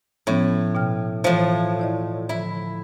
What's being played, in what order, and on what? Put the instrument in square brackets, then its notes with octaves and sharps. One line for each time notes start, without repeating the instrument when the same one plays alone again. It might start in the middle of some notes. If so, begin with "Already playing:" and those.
[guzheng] A2 [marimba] F3 B3 C#4
[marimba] B2 G5 F6
[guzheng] A2 F3 [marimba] E3
[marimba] E4 D5 D#5
[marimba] D3 F3 [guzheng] E4